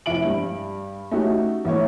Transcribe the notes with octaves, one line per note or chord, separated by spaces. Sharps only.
F1 E4 E5 D7 F#7
G2
A3 C#4 D#4 F#4 G4
A1 A3 C#5